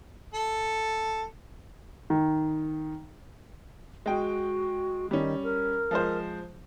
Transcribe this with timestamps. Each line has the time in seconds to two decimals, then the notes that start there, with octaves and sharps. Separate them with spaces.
0.34 A4
2.10 D#3
4.06 G#3 F#4 G5
5.11 D#3 G3 C#4
5.43 A#4
5.91 F3 G#3 C5